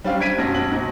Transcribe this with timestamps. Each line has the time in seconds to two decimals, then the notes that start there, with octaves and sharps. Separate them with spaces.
0.04 G3 C#4 D4 C5 F5
0.20 G#6 B6 D7 D#7
0.38 B1 F#2 F#3 A#6
0.54 B1 F#7
0.72 B1